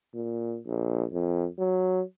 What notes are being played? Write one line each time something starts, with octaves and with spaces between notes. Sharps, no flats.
A#2
A#1
F2
F#3